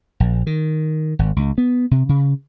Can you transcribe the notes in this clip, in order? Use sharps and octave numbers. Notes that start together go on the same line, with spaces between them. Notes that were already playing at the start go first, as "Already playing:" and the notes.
A#1
D#3
G#1
C#2
B3
C3
C#3